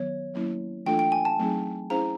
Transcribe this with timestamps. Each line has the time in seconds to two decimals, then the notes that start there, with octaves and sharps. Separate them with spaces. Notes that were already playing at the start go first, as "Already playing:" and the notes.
Already playing: D#3 F#3 B3 C#5
0.34 F#3 A#3 C#4 E4
0.86 E3 A3 D4 F4 A4 G5
0.99 G5
1.12 G#5
1.25 A5
1.39 F#3 A3 C4 D#4 G#4
1.90 C#4 E4 G#4 C5 F5 A#5